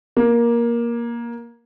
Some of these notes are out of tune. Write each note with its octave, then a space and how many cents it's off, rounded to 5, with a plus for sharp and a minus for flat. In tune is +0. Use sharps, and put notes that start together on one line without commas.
A#3 +15